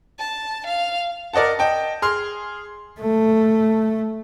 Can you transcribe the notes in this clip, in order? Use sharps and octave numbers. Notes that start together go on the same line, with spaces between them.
A5
F5
A#4 D5 D#5 F#5 A5
D#5 G5 A5
G#4 C6 F6
A3